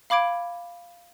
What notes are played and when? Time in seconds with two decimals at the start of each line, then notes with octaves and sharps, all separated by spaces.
0.10 F5 B5 D6 G#6 D7